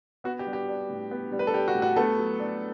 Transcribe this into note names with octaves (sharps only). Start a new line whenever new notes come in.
B3 F#4
G4
G3
G4
D4
A2
B3
G3
B4
A4
D4 G4
F#4
A2
F#4
A3 B3 A4
F#3
D4